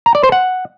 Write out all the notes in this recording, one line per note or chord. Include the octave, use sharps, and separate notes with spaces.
A#5
D5
C5
F#5